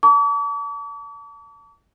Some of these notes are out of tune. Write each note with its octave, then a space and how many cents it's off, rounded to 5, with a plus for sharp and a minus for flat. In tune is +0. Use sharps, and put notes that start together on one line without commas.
A5 +30 D6 -45